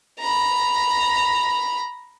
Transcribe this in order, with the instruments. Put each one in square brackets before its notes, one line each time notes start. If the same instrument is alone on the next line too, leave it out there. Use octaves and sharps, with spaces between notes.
[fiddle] A#5 B5